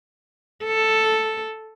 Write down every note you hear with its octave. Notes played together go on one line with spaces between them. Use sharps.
A4